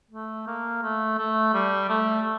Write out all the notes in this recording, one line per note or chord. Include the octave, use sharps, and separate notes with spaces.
A3
A#3
A3
A3
G3
A3